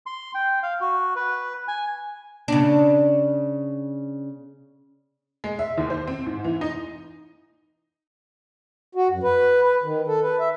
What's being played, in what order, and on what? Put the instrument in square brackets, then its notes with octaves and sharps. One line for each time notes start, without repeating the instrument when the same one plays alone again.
[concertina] C6
G5
F5
F#4
B4
G#5
[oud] C#3 D4
[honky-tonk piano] G#3
E5
D#2
C5
C4
G#2
E3
D#4
[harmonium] F#4
F#2
B4
B4
D#3
A4
B4
E5